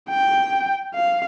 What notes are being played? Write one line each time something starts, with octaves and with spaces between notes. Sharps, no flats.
G5
F5